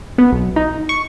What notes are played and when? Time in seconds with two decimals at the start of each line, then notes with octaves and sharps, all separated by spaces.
0.18 B3
0.32 B1
0.56 D#4
0.89 C#6